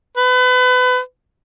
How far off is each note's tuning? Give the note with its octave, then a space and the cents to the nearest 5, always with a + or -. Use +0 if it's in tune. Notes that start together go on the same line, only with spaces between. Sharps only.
B4 +30